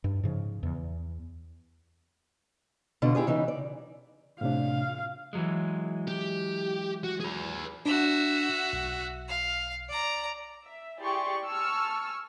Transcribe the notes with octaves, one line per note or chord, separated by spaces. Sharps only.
G2
G#2 C#3 F3
E2
B2 D3 F4
E4 G4 G#4 D#5
C#3 E3 D#4
D5
A2 C3 D4 F5
E3 F#3 G#3
G4
F#4
G#4 B4
D4 F#4 E5
B1
F5
D5 A#5
E5
E4 G4 G#4 D5 C6 C#6
G#5 A5 C#6 E6 F6